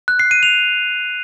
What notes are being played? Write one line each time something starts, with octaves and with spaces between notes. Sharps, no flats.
F#6
C7
D#7
F7